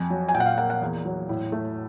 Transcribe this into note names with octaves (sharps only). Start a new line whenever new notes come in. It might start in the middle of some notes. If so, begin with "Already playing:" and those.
Already playing: F2 G#5
F#3
G#5
A#2 G5
F#5
F5
A#3 F#5
F#5
E2
F#3
A2
A3